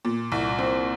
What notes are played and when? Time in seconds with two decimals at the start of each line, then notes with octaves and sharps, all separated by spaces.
0.05 A#2
0.32 C2
0.59 C4